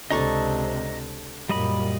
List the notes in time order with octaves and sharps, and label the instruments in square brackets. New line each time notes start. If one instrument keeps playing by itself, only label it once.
[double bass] C#2 C3 [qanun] D4 A4 A5 [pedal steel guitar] D#5 A#5 C#6
[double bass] F#2 A#2 [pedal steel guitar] G3 D#5 B5